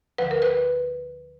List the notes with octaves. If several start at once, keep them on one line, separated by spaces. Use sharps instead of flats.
D2 D3 F3 B4
A#4
B4